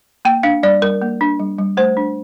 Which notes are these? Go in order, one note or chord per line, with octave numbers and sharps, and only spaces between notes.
A#3 G5
D4 F5
G3 D5
G3 A#4
A#3
D4
G3
G3
A3 C5
D4